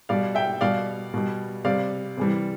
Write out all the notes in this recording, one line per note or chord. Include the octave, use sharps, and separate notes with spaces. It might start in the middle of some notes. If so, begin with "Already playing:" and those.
B2 G3 D5 F5
E5 G5
B2 G3 D5 F5
B2 G3
C3 G3 D5 F5
C3 E3 G3